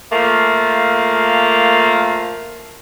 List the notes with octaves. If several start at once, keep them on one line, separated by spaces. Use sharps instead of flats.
F3 A3 A#3